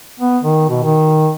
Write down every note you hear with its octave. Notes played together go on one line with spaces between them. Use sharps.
B3
D#3
B2
D#3